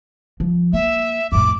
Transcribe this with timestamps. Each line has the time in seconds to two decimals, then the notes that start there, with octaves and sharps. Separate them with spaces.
0.40 F3
0.73 A#3 E5
1.32 F2 A2 D6